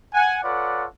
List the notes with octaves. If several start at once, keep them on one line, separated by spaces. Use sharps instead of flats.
F#5 G#5
F4 A4 B4 C#5 D5 F#5